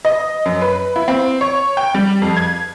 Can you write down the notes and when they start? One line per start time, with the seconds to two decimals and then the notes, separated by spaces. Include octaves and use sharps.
0.05 D#5
0.45 F#2
0.61 B4
0.96 E4
1.08 C4
1.41 C#5
1.77 G5
1.94 G3
2.22 F2
2.37 G#6